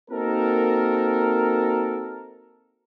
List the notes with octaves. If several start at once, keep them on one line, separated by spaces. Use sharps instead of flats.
A#3 C4 D#4 F#4 A4 A#4